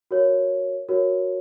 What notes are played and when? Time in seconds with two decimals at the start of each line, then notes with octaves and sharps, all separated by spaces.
0.11 F#4 A#4 C#5
0.89 F#4 A#4 C#5